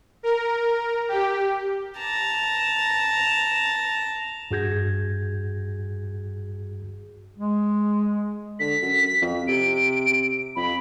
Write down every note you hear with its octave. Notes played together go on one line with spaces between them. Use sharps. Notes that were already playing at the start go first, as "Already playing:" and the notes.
A#4
G4
A5 A#5
G2 F#4 G#4 G6 G#6 A#6
G#3
D3 B6
F#2
F2
C3 D7
F2 B5